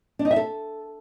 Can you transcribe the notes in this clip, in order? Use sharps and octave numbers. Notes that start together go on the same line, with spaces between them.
D4
D#4
E5
A4